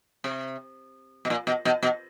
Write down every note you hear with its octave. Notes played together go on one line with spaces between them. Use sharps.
C3
B2
A#2
B2
B2
B2